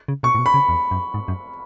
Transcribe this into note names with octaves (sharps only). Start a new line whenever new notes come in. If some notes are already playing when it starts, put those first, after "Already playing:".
C#3
B2 C#6
A2
B2
B5
C#3
E2
F#2
G#2
F#2